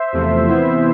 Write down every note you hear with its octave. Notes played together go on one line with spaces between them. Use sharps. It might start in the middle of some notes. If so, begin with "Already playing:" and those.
Already playing: C5 E5
E2 C3 F3 A3
C3 E3 B3 E4 C5 E5